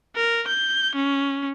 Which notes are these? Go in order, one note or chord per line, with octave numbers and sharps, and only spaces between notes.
A#4
G6
C#4